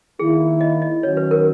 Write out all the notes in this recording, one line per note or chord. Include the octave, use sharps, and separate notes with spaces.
D#3 A#3 E4 G#4
D#5
D#5
D#3 F#3 C#4 F#4 C#5
B4
A#4